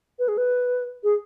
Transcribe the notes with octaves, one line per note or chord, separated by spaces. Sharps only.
B4
G#4
B4
G#4